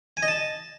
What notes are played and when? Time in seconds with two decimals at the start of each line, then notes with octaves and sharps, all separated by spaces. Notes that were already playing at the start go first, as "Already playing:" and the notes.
0.17 G#5
0.23 D#5
0.28 A5